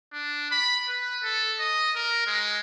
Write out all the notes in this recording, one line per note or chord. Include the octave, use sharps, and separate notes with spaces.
D4
B5
B4
A4
D#5
A#4
G#3